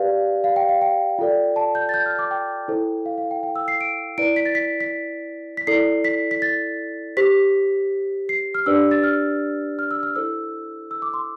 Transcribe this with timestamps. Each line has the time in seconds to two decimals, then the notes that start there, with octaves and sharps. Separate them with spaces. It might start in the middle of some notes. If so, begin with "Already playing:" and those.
Already playing: G4 B4 D5 F5
0.44 F5
0.56 G5
0.69 F5
0.81 G5
1.19 F4 A4 D5
1.56 A5
1.75 G6
1.89 A6
1.94 G6
2.06 F6
2.19 D6
2.31 G5
2.68 E4 A4 C5
3.06 F5
3.18 F5
3.31 G5
3.43 G5
3.56 E6
3.68 C7
3.81 D7
4.18 E4 B4 D5 D7
4.36 B6
4.46 A6
4.55 B6
4.80 B6
5.57 B6
5.67 E4 A4 D5 C7
6.04 B6
6.31 B6
6.42 A6
7.17 G4 C5 B6
8.29 C7
8.55 F6
8.66 D4 G4 B4 D5 E6
8.91 A6
9.04 F6
9.79 F6
9.91 E6
10.03 F6
10.15 E4 A4 C5 E6
10.91 E6
11.02 D6
11.14 C6